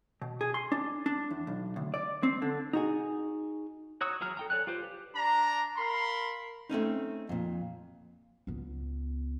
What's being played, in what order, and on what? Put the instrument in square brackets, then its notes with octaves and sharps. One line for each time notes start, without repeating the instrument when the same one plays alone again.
[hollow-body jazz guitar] B2
G#4
C6
D4
D4
E2
B1
D2
D5
C4
D3
D#4 F#4 G#4
[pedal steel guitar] F#4 C#5 A#5 D#6 E6
E3 F#3 G#4 A#5 F6
A4 G5 A#5
A4 C#5 D5 G#5 F#6
F4 G4 B4 C5
G4
[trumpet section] D4 A#5
A#4 F5 B5 C6
[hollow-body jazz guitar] A3 C4 C#4 D#4
F2 A#2
[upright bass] C#2 B3